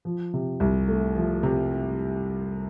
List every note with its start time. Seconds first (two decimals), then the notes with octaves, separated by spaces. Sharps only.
0.05 F3
0.34 C3
0.60 C2
0.88 A3
1.16 F3
1.43 C3